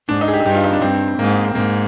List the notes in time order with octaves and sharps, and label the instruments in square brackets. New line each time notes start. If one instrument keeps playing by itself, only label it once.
[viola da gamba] G#2 [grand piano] D4
[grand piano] D#4
G#4
G4
G#4
[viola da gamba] G2 [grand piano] G4
[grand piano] F4
D#4
D4
[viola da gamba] G2 [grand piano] C4
[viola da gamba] G#2 [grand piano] A#3
[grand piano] C4
[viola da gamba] G#2 [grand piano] A#3